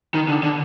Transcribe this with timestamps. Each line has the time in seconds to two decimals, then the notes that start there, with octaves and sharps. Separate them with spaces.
0.14 D#3
0.28 D3
0.43 D3